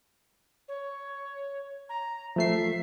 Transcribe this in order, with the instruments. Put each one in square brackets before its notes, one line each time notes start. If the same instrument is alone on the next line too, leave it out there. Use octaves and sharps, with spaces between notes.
[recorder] C#5
A#5
[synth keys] F3 A3 C7 [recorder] E5